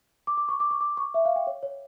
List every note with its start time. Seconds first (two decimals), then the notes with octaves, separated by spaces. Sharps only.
0.27 D6
0.37 D6
0.49 C#6
0.60 D6
0.71 C#6
0.81 D6
0.97 C#6
1.14 E5
1.25 F5
1.36 G5
1.47 C#5
1.63 C#5